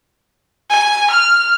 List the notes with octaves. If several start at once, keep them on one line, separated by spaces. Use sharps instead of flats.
G#5
F6